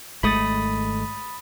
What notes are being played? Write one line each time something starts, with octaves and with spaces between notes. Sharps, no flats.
G#1 G#3 A3 B5 D#6 A6